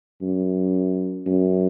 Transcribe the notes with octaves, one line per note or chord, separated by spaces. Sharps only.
F#2
F#2